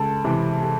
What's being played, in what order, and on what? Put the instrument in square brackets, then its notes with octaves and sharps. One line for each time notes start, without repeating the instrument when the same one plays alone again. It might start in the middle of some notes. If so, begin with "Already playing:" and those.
Already playing: [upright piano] C#2 [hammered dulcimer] A4
[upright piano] C3 E3
[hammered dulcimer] A4